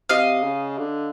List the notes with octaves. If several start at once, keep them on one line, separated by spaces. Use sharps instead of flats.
C3 D#5 F5
C#3
D3